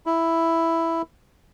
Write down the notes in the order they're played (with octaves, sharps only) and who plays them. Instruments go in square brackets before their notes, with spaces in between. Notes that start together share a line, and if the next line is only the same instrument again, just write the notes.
[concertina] E4